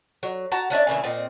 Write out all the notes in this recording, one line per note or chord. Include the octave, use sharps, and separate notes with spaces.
F#3
F#4 A5 A#5
C#4 D4 E4 D5
A#2 C#3 E3 A3
A#2 C4 D#5